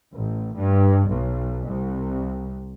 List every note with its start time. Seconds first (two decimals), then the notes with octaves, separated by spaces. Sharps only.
0.16 A1
0.57 G2
1.10 B1
1.67 C2